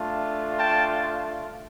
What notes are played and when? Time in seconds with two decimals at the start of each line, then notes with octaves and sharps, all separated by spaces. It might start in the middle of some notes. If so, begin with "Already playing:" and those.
Already playing: A3 D4 F4
0.57 G5 A5